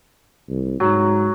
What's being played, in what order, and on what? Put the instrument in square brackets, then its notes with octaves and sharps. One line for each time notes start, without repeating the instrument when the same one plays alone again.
[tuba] C2
[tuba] G#2 [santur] F#3